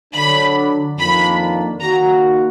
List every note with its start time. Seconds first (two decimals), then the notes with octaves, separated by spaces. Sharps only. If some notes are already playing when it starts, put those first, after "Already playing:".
0.14 D3 F#3 D4 B5
0.97 F2 D#3 A#3 D4 B5
1.80 D#3 A#3 D#4 F#4 A#5